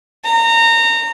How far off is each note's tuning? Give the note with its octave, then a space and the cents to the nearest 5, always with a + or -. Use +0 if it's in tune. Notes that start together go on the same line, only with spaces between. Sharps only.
A#5 -25